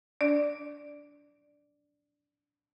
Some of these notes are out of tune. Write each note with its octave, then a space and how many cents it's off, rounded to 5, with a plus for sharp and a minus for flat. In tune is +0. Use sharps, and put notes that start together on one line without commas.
D4 -20 D5 +0